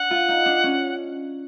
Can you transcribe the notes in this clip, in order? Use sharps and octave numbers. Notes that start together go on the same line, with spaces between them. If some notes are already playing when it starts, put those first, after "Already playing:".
Already playing: D4 F#5
F4
D#4
D4
C#4